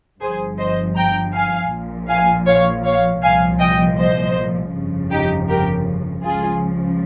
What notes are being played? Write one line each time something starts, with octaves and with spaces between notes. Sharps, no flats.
G1 G2 F3 G#4 C5
C5 D#5
G5 A#5
F5 G#5
A#1 A#2 F3
F5 G#5
C#5 F5
C#5 F5
C2 A#2 F3 F5 G#5
D#5 G5
C5 D#5
G1 F2 C#3 F3
D#4 G4
G4 A#4
C#2 C#3 F3 F4 G#4